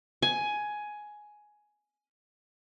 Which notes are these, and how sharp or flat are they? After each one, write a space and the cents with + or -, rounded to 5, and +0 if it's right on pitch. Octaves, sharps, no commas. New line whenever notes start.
G#5 +10